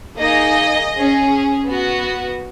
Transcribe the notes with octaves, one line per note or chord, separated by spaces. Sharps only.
A#3 D#4 G#4 D#5
C#4 G#4
B3 F#4